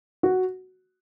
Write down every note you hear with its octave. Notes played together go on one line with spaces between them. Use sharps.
F#4